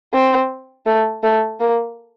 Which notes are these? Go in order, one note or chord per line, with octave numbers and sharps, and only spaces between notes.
C4
A3
A3
A#3